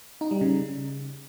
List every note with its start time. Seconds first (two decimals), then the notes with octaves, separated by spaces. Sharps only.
0.21 D#4
0.31 G3
0.41 C#3